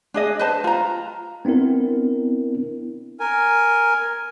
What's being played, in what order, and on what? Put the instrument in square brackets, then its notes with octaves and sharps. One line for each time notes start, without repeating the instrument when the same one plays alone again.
[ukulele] D4 G#4 D#5
B4 C5 A5
F4 A#5
[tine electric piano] B3 C4 D4 E4 A#4
[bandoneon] A#4 G#5